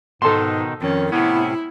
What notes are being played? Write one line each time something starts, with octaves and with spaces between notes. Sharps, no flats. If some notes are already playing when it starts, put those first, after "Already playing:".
G#2 B2 D#3 D#4 A4 C6
F2 D#3 C#4
A2 C3 B3 C#4 E4